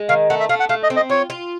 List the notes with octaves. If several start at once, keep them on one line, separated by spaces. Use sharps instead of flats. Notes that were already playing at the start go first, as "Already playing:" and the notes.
Already playing: G#3
D#3 F5
A3 F#5
E5
A3 F5
F#5
A3 F5
D#5
C4
D#5
F4 C#5
F4